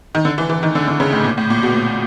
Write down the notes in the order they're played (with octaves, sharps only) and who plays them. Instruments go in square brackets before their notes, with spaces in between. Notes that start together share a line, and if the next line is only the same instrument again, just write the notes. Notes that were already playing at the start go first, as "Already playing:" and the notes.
[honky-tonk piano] D#3
D3
E3
E3
D#3
D3
D3
C#3
A2
A#2
A2
A#2
B2
A#2